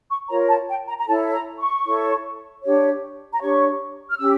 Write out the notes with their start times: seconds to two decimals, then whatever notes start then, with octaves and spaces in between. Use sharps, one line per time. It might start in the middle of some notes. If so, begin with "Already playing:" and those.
0.10 C#6
0.29 F4 A#4 C#5 A#5
0.48 A5
0.68 G5
0.87 A#5
0.99 A#5
1.08 E4 A4 C#5 A5
1.33 A#5
1.59 C#6
1.84 E4 A4 C#5
2.63 D4 G4 C#5
3.33 A#5
3.40 D4 G4 C#5 C#6
4.10 F6
4.18 C#4 G4 E6